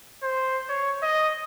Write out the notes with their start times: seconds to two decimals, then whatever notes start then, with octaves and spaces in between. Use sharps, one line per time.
0.23 C5
0.69 C#5
1.02 D#5